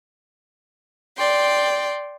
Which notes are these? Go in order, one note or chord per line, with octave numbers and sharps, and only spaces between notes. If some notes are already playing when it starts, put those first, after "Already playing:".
D5 G5 C6